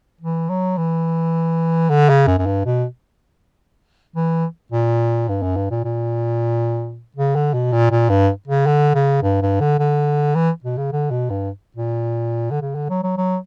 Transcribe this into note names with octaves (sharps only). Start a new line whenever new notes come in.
E3
F#3
E3
D3
C#3
F#2
F#2
G2
B2
E3
A#2
G2
F#2
G2
A#2
A#2
C#3
D3
B2
A#2
A#2
G2
C#3
D3
C#3
G2
G2
D3
D3
E3
B2
C#3
D3
B2
G2
A#2
D3
C#3
D3
F#3
F#3
F#3